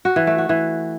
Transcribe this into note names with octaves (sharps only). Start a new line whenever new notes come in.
F#4
E3
A3
F#4
E3